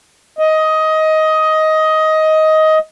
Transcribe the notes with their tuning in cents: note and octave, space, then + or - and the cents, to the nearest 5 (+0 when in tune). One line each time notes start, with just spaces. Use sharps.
D#5 +15